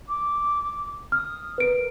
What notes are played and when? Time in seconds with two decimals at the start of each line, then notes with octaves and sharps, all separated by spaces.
0.08 D6
1.12 D#6 F6
1.58 A#4 B4 D7